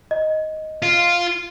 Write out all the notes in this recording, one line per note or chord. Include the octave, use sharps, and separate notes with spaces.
D#5
F4